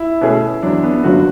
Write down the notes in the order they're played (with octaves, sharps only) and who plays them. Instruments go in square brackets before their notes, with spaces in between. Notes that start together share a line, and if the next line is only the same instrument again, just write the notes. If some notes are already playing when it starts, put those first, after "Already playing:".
Already playing: [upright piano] E4
[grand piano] B2 A3 C#4 G#4
[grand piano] E2 D3 F#3 [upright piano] D4
[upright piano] B3
B3
[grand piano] F#1 F#2 D3 F#3 [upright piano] F#4